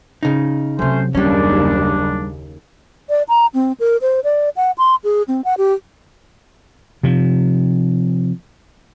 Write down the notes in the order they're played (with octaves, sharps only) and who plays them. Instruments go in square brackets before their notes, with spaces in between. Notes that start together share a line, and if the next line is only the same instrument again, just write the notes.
[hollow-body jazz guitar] C#3 D#4
[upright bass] C3 F#3 [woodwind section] A3 C#4 C5
[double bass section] F#1 D#2 C#3 [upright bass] F#3 [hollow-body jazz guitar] G3 C#4 [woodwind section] D4
[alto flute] D5
A#5
C4
A#4
C5
D5
F#5
C6
G#4
C4
F#5
G4
[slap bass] C3 F3